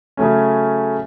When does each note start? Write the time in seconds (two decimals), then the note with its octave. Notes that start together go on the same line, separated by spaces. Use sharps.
0.17 C#3 F#3 A3 C#4